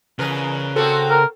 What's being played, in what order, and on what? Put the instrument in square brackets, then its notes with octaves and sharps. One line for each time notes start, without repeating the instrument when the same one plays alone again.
[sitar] E2 A#4 B4 [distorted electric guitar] C#3
[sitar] A#3 C4 F#4 [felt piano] A4
[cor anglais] A#4